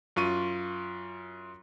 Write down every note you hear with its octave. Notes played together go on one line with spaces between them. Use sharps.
F#2 F4 C#6 D#7